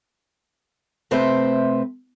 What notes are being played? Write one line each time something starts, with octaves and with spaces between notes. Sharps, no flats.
C3 A3 C4 B4 C5 E5